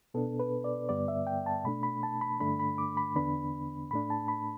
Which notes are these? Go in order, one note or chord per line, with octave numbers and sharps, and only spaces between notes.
B2 B3 D4 A4
B4
D5
G2 D3 G3 B3 D5
E5
G5
A5
B2 A3 D4 B5
B5
A5
B5
G2 D3 A3 D4 B5
B5
D6
B5
E2 D3 B3 D4 B5
A2 A3 D4 B5
A5
B5